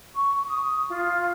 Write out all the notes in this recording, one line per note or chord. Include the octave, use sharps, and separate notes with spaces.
C#6
D#6
F4